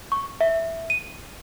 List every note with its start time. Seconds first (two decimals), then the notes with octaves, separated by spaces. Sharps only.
0.12 C#6
0.41 E5
0.90 D#7